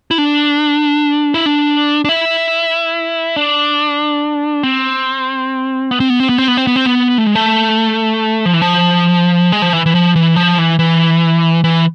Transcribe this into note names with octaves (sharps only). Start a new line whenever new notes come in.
E4
D4
E4
D4
D4
E4
D4
C4
B3
C4
B3
C4
B3
C4
B3
C4
B3
C4
B3
A3
G#3
A3
F3
E3
F3
G#3
F3
E3
E3
F3
E3
F3
E3
E3
E3